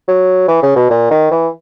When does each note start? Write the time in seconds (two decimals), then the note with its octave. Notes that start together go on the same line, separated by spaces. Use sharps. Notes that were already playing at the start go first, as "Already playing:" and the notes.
0.08 F#3
0.48 E3
0.63 C#3
0.76 B2
0.90 A#2
1.11 D#3
1.31 E3